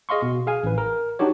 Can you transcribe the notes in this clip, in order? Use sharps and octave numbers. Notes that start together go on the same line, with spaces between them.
G#4 D#5 F5 C6 C#6
B2
G#4 F5 G#5
A1 B4
A#4
D4 D#4 F#4 G4 C#5